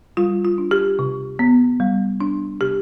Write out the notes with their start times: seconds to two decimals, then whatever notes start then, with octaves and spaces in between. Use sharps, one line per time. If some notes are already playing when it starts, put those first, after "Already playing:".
0.17 G3 F4
0.45 F4
0.58 D4
0.71 G4
0.99 C3
1.39 B3
1.80 G3
2.21 D4
2.61 C3 G4